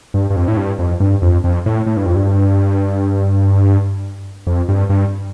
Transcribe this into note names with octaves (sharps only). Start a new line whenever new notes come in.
G2
G2
F2
A2
G2
F2
G2
F2
F2
A2
A2
G2
F2
G2
F2
G2
G2